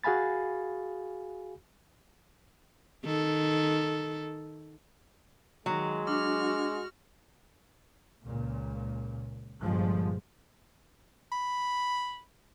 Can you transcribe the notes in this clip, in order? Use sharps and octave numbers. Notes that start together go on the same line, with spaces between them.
F#4 G#4 F5 G#5 B5 A6
D#3 A4
D#3 F#3 G#3
D4 F#4 F6
C#2 A#2
G1 A#2 F3 G#3
B5